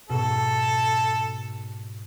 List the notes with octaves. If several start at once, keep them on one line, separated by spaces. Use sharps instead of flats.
G#2 B2 A4